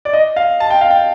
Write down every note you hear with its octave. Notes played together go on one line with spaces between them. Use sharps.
D5
D#5
F5
A5
G5
F5
G5